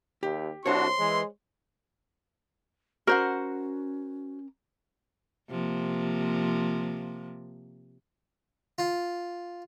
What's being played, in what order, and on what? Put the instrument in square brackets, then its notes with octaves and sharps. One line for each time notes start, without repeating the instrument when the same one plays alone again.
[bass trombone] D#2 [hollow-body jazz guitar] G4
[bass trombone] C2 [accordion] D4 F#4 [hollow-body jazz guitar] C5 C#5 [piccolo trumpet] C6
[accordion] E3 [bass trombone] G#3
[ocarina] C#4 [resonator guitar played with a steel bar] F#4 C5 F#5 [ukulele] A#4
[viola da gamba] C3 F3 A#3
[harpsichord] F4